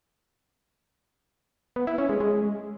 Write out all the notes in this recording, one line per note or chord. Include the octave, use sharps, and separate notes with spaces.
B3
E4
C#4
G#3
G#3